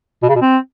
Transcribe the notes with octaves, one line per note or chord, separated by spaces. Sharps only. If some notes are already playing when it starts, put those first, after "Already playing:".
B2
C#3
B2
C4